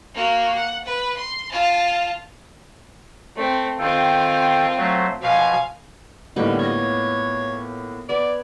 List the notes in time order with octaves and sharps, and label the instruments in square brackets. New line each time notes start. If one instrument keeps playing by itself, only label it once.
[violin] A#3 F#4
F#5
B4
C6
F4 A5
[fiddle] A3 C4
[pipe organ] D#3 A4 G5 [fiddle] C4 F4
[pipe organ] F#3 A3 C5
[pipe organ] B2 F3 [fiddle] F5 G#5
[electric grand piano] A2 A#3 B3 [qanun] D3 G3 [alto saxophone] D#4
[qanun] F4 D#5 [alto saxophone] C#5
[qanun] B3 G#5 [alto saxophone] D5